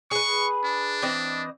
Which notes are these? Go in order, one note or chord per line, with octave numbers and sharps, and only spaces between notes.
G#4 B4 C#6
D4
E3 C4 D#5